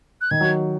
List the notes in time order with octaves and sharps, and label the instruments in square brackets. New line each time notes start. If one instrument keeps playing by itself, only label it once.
[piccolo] F#6
[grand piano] D#3 [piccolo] G#6
[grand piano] F#3